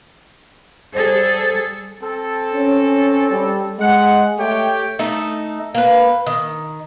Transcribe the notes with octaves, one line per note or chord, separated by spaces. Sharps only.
G3 G#4 A4 C5
C4 A4
C#4
G3
G#3 F#5
A3 G4 C#5 G5
A3 D#4 A4
A#3 B4
D#3